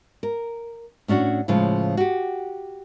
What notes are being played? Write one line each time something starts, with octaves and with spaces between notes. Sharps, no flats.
A#4
A2 C#4 D4 F#4
A2 C#3 F3 G#3 F4
F#4 G4